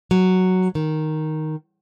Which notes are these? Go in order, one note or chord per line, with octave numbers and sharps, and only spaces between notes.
F#3
D#3